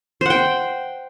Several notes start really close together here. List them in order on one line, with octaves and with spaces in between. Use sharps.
C5 F#5 G5